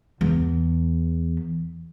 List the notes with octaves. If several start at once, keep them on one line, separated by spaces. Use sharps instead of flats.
E2